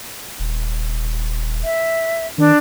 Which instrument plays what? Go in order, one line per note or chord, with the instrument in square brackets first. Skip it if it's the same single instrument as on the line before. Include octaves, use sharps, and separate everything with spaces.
[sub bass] D#1
[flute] E5
[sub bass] D#3 [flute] D4